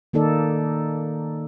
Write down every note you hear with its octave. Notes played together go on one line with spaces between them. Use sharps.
D#3 A#3 D#4 A4 D5